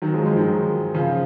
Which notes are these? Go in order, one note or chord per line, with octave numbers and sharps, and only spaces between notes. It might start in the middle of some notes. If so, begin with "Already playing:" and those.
D#3 F#3
F3 G#3
F3 G#3
D#3 F#3
C#3 F3